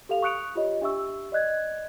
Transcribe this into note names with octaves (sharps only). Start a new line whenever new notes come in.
G4 A4 F5 F7
C#6 D#6 F#6 C#7 D7 F7
F4 G4 C#5 D#5
D4 G4 E5 C#6 E6
D5 D#5 F#6 G#6